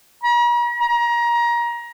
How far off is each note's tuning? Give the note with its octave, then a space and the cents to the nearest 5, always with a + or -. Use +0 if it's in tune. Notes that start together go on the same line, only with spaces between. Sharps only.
A#5 +45
A#5 +25